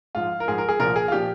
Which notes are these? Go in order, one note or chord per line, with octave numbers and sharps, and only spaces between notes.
G#2 F3 F4
A#4
G#2 F3 G#4
A#4
G#4
C2 A#2 F3 A#4
G#4
F4
A#2 F3 G4